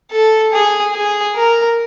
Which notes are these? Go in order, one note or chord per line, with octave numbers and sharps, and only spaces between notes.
A4
G#4
G#4
A#4